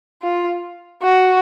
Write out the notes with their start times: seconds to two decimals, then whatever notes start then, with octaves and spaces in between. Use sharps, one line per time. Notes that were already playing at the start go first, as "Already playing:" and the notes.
0.22 F4
1.03 F#4